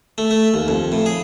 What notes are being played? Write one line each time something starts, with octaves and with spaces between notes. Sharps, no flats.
A3
A3
D#2
F2
A2
G#4